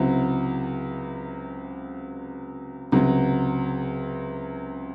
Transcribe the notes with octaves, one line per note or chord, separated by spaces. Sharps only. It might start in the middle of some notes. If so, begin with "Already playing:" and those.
Already playing: C#2 C3 F#3 C4 E4
C#2 C3 F#3